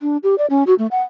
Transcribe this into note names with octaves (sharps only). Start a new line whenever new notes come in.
D4
G4
D5
C#4
F#4
A3
F#5